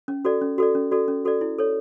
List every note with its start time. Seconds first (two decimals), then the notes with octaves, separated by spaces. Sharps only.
0.08 C#4
0.25 F#4 A4 D5
0.41 C#4
0.58 F#4 A4 D5
0.75 C#4
0.91 F#4 A4 D5
1.08 C#4
1.25 F#4 A4 D5
1.41 E4
1.58 A4 C#5